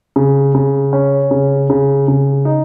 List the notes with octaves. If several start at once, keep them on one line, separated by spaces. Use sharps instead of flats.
C#3
C#3
C#4
C#3
C#3
C#3
D#4